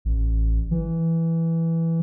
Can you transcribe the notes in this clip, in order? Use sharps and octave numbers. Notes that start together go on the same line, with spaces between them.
A1
E3